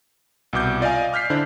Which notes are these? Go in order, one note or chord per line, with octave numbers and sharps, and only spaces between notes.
C2 B2 D6 G6
F4 D5 D#5 F5 G#5
D6 F6 G6 B6 C7
D3 D4 E4 C5